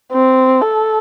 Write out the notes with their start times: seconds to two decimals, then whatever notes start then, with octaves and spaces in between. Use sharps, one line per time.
0.13 C4
0.62 A4